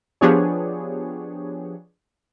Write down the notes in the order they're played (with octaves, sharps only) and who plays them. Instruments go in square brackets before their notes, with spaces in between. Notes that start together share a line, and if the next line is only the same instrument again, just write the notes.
[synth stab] F3 B3 D4 G4 G#4 C#5